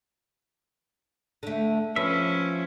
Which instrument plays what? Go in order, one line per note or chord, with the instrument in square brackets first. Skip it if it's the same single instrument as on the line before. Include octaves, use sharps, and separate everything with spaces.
[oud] D3 A3
[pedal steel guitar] F3 E5 [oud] B3 [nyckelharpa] C#4